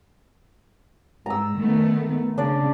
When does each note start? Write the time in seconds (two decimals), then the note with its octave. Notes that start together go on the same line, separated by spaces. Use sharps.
1.26 G#2 A#5 E6
1.58 D#3 A3 B3
2.38 C#3 D4 D5